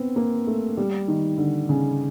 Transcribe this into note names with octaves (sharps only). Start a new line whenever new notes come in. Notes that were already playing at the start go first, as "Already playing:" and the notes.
Already playing: B3 C4
A#3
A3
G3
D#3
D3
C#3